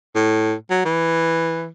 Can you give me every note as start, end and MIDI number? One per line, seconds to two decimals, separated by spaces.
0.15 0.54 45
0.70 0.82 54
0.85 1.68 52